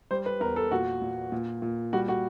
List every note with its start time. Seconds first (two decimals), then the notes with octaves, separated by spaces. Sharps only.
0.11 G3 C5
0.26 B4
0.40 E2 A#4
0.56 A4
0.71 A#2 F#4
1.02 A#2
1.32 A#2
1.62 A#2
1.93 G3 F#4
2.08 F#4